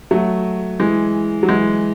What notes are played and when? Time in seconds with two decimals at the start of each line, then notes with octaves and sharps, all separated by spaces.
0.11 F#3 A3
0.80 E3 G#3
1.43 F#3
1.49 E3 G#3